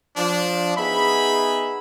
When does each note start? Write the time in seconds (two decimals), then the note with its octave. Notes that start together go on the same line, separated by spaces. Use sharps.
0.17 F3 D4
0.77 B3 D#4 G#4 E5 B5